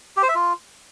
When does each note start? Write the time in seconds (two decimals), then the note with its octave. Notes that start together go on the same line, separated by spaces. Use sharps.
0.16 G4
0.23 C5
0.29 E5
0.35 F4